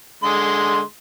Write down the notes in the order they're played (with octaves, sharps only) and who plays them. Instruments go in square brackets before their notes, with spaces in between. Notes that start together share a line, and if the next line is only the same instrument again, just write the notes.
[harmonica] D3 G#3 C6